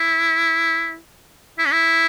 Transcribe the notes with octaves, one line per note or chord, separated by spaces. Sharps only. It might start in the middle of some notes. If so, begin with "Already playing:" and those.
Already playing: E4
E4
C#4
E4